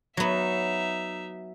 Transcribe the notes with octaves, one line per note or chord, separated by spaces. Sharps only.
F#3 B3 D#4 E5